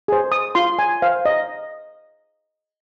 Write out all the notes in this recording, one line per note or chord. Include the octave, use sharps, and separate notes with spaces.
G#4 C5
D#6
F4 C6
G#5
C5 F5
D#5